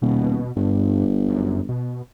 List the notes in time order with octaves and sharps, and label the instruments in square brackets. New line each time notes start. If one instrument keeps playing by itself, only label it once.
[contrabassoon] D#1 [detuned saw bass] B2
[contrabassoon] G1 [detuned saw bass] G2
[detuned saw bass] F#2
B2